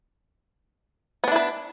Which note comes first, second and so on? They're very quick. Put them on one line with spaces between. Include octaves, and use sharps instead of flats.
B3 D4 E4 B4